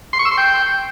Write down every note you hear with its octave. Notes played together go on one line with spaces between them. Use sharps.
C6
C#6
E6
C6
G5